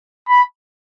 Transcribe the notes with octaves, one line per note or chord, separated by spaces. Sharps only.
B5